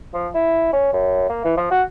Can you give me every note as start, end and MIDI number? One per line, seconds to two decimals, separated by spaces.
0.14 0.28 53
0.34 0.72 64
0.73 0.89 61
0.93 1.27 42
1.30 1.42 58
1.45 1.55 52
1.57 1.71 53
1.71 1.82 66